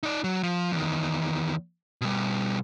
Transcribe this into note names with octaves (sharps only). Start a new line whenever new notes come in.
D#4 D5
F#3
F3
E2 D#3
B2 G3